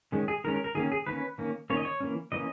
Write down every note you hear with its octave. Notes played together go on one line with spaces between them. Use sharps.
D#3 G#3 C#4
G#4
D#3 G#3 C#4 A#4
A#4
A#4
D#3 A#3 C#4 G#4
G#4
D#3 A#3 C#4 B4
D#3 A#3 C#4
D#3 A#3 C#4 C#5
D#5
C#5
E3 A#3 C#4
E3 A#3 C#4 D#5